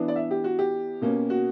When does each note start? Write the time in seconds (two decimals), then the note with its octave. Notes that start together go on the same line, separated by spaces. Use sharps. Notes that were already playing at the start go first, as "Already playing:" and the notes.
Already playing: E3 B3 D4
0.08 D5
0.16 E5
0.31 G4
0.44 F#4
0.59 G4
1.01 B2 A#3 C#4
1.30 F#4